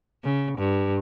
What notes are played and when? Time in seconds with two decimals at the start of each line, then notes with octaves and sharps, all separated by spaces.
0.24 C#3
0.58 G2